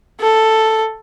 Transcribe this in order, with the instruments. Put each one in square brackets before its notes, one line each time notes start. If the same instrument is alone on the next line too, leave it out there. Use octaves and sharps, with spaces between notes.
[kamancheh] A4